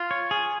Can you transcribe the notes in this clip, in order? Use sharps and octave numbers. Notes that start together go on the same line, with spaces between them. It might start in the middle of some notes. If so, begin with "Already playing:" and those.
Already playing: F4
C#5
G#4